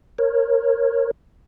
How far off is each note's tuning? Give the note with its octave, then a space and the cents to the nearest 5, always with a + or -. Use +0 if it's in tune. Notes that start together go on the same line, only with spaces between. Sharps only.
A#4 +0 C#5 -25